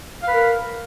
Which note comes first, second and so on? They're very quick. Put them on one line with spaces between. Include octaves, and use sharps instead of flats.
F5 B4 A#4